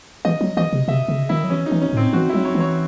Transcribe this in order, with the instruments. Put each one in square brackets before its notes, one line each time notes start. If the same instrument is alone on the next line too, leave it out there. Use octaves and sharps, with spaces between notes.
[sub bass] E3 [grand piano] D#5
[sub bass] F#3
[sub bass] E3 [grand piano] D#5
[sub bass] C3
[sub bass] C3 [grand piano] E5
[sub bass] C#3
[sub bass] D#3 [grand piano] E4
[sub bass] F#3
[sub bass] E3 [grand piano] C#4
[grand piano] D#4
[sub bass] E3
[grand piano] C#4
[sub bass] A2 [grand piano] C4
[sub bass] E3 [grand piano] F#4
[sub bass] F#3 [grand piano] E4
[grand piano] C#5
[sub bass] E3
[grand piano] C#5